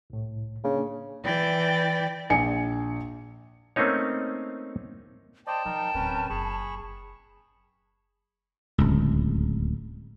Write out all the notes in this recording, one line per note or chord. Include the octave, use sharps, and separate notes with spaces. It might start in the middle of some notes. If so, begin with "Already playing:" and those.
C2 A2
C#3 A#3 D4
E3 D5 G5
A#1 G#5 C#7
A3 A#3 C4 C#4 D#4 C#5
C5 D5 D#5 G5 A5
F3 D#4 A#4
D1 C4 C#4 A#4 B4
F#1 G#4 B5 C#6
D1 C#2